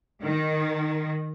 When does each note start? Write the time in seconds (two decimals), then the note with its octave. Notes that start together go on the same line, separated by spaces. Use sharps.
0.21 D#3